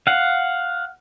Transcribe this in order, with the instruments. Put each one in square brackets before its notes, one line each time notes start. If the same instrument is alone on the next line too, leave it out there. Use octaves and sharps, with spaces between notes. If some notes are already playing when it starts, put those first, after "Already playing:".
[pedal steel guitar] F5 F#5